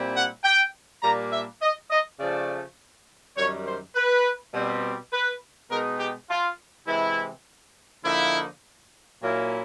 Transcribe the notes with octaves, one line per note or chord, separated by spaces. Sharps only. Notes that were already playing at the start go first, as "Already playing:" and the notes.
Already playing: A#2 G3 C4 E4
F#5
G5
A#2 G3 A#3 D4 A#5
E5
D#5
D#5
C#3 F3 A3 D5
F#2 D#3 G3 C#5
C5
B4
B2 G3 C4
B4
B2 G#3 B3 D#4 A#4
G4
F4
C3 E3 G#3 E4
D3 F3 A#3 D#4 E4
A#2 F#3 A#3 C#4 E4